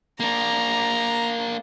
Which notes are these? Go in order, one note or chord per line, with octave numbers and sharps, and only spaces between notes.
A#3 D4 A#5